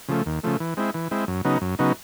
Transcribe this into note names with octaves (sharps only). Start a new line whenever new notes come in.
C#3 F3 A3
D#2
C#3 F3 A3
E3
G#3 C4 E4
E3
G#3 C4 E4
F#2
C#3 F#3 B3 D#4
F#2
C#3 F#3 B3 D#4